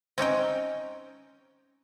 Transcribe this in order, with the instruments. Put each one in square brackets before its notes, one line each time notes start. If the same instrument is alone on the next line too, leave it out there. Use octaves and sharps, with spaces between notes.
[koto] C4 C#4 D#4 G5